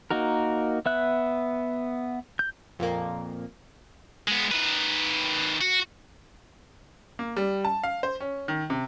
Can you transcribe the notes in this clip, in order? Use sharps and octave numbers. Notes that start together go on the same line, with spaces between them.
A#3 D#4 F#4 A#4
B3 E5 F#6
G6
F2 A#2 A#3
G#3 B3
D#3 B4
F#4
A#3
G3
A5
F5
C5
C#4
D#3
C3